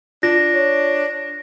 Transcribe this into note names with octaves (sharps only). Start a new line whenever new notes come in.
D4 F4 A#6
C#5